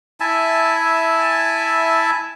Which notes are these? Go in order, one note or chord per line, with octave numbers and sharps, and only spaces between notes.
E4 E5 G#5 A5